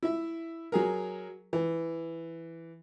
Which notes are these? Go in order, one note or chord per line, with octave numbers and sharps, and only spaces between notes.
E4 E5
F#3 G#4 A#4
E3